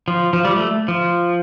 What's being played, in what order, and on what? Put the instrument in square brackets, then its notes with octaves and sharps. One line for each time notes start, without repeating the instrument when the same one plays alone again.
[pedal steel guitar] F3
F3
G3
A3
F3